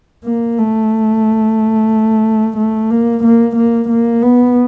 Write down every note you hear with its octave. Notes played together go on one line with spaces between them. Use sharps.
A#3
A3
A3
A#3
A#3
A#3
A#3
B3